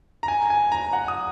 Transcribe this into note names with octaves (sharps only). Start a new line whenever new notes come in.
A#5
G#5
G#5
A#5
F#5
D#6